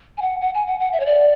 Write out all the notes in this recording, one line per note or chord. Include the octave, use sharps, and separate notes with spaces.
G#5
F#5
F#5
G#5
F#5
F#5
E5
C#5
D5